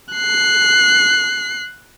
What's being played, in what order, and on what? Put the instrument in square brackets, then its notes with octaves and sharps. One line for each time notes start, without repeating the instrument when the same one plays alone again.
[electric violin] F#6 C7